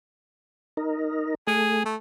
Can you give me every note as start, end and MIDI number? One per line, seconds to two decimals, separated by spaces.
0.77 1.35 63
0.77 1.35 70
1.47 1.84 57
1.47 1.84 68
1.85 1.96 57